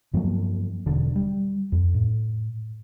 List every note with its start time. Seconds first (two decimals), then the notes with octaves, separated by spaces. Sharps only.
0.14 G2 F3 F#3 A#3
0.86 E1 D3
1.16 G3
1.72 F2
1.94 A2